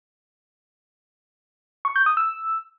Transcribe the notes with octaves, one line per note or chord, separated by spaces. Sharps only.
C#6
G6
D#6
E6